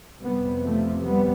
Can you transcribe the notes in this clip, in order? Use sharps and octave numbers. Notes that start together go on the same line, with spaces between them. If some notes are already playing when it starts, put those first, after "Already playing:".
F2 C3 G3 B3
F3 A3
G3 B3